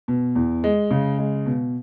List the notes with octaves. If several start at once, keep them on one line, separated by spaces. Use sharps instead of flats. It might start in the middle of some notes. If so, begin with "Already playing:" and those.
B2
E2
G#3
C#3
G#3
B2